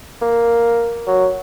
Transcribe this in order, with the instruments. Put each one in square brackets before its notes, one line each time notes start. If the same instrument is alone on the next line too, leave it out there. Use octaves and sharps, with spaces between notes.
[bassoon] A#3
F#3